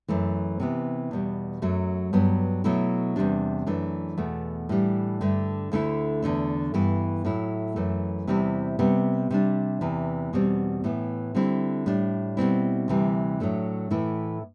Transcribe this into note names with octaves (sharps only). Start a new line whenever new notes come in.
F#2 E3 A3
C3 E3 B3
E2 B2 G3
F#2 F#3 A3
G2 F#3 B3
B2 F#3 A3 E4
E2 C3 G3 D4
F#2 E3 A3 D4
E2 B2 A3
A2 E3 G3 D4
G2 D3 A3
D2 D3 A3 E4
E2 D3 A3 D4
G2 E3 B3 E4
A2 F#3 A3 E4
F#2 E3 A3
E2 C3 G3 C4 E4
C3 G3 B3
C3 G3 D4
E2 C3 E3
E2 B2 G3 C4
A2 E3 B3
D3 G3 C4 E4
A2 G3 D4
B2 G3 C4 E4
D2 C3 E3 G3
A2 F#3 A3 D4
A2 E3 A3 E4